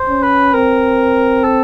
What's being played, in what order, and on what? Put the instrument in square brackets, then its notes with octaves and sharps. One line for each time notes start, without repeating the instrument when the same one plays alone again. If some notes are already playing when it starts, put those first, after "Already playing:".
Already playing: [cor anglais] C5
[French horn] C#4
[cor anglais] B4
[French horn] C4 [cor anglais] A#4
[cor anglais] A4